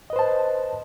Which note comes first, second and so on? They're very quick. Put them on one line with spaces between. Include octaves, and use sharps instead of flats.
D#5 B4 C5 A5